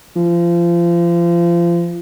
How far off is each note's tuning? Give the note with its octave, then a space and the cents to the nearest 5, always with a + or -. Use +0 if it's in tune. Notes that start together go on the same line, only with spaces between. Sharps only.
F3 -30